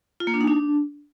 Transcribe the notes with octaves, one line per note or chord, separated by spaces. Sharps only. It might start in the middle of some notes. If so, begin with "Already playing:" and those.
F4
A#3
D4
D#4
D4